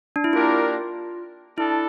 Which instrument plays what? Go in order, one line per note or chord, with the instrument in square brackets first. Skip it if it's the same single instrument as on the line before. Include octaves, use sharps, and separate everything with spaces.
[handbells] D4
E4
[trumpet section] A#3 D4 G4 A#4 D5 [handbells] F4
[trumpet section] D4 A4 [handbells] E4